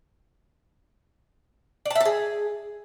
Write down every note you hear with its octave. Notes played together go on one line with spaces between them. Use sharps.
D5
A5
E5
A5
G#4